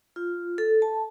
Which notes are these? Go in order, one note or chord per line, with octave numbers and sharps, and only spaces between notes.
F4
A4
A5